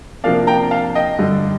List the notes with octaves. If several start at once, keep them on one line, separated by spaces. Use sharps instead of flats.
C3 F3 A#3 D4 F5
G5 A#5
F5 A5
D#5 G5
G2 D3 G3